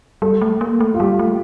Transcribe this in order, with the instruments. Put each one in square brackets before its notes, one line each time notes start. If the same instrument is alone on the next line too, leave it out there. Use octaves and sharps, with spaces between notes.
[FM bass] G3 [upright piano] A4
[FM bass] A3
A#3
A3
[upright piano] F4
[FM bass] G3 [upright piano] G4
[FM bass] A3